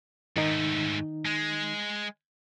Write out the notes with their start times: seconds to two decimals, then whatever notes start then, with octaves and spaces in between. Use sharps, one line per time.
0.37 G#2 D#3 A3 D#4
1.25 G#3